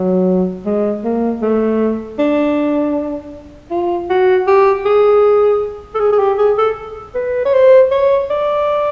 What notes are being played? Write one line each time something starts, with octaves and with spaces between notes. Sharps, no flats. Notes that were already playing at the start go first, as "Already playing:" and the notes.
Already playing: F#3
G#3
A#3
A3
D4
F4
F#4
G4
G#4
A4
G#4
G#4
G4
G#4
A4
B4
C#5
C5
C#5
D5